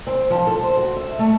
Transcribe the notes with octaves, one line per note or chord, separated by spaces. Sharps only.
C4
F3
A4
C5
F#4
E5
A3